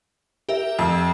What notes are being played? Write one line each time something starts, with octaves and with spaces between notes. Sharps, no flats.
G4 A#4 E5
F2 E6